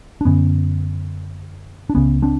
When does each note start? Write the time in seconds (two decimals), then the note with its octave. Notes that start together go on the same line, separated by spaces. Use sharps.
0.21 D4
0.25 F#2 D3 B3 C#4
1.90 D4
1.95 C#2 C#3 B3 C#4
2.22 C4 D4